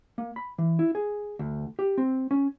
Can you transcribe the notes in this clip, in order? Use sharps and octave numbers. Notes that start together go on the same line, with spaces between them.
A#3
B5
E3
E4
G#4
D2
G4
C4
C#4